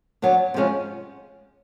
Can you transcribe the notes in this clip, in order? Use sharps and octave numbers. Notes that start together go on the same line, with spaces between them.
F#3 B3 D4
C3 F3 G#3 C#4